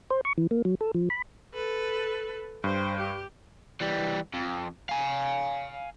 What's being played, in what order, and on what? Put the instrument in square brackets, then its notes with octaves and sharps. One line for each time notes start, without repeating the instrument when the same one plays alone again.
[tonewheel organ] C5
C#6
E3
A#3
F#3
A4
F3
B5
[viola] A4 B4
[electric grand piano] G2 [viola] C5 G5
[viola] G4
[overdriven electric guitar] E3 G3
F2
F5 G#5